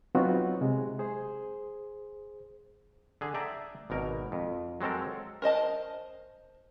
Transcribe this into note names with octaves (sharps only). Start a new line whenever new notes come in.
F#3 B3 C4 D#4 F4 F#4
C3 G#3
G#4 C5
D3 G#4
D5 E5 G5 A5 A#5
G#1 B2 A#4
F2
F#3 G#3 C4 A4 A#4
A#4 C5 D#5 A5